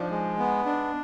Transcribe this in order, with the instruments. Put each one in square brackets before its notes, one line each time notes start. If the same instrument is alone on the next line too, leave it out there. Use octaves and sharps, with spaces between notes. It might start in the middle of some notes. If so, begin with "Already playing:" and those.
Already playing: [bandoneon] F3 [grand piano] D4 D#4
[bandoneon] G#3
B3
D4